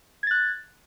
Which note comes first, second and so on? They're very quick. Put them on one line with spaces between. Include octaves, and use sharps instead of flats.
G#6 A6 F#6